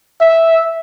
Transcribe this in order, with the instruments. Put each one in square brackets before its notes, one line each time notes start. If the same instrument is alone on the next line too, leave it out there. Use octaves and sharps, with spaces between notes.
[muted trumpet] E5